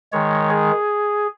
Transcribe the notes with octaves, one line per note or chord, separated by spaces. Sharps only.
D#3 G#3 C#5
G#4